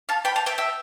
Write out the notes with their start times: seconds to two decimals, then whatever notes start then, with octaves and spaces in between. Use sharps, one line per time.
0.09 F5 A5
0.25 G5 B5
0.36 F5 A5
0.46 E5 G5
0.58 E5 G5